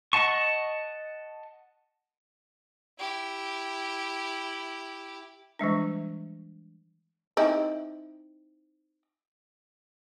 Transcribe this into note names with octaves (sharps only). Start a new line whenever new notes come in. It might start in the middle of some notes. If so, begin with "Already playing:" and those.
D#5 F#5 A5 C#6
E4 G4
E3 G3 G#3 D4
C4 D#4 E4